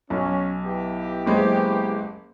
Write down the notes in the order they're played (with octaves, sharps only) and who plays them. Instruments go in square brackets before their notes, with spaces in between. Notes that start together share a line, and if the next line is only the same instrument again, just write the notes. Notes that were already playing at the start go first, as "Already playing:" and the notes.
[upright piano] B1 [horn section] C#4
[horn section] B3 E4 G4
[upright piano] F#1 G#3 C5